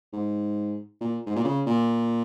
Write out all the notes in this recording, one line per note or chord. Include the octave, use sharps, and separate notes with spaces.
G#2
A#2
G#2
A#2
C#3
A#2